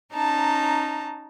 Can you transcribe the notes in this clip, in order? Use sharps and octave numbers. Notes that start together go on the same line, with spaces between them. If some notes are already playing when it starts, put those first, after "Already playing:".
C#4 D#4 A5 A#5